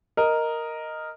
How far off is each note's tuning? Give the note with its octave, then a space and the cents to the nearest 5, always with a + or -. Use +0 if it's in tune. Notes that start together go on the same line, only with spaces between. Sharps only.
A#4 +0 D#5 +0